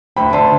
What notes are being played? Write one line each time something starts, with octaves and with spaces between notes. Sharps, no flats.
D2 G5 B5
D3 A5 C6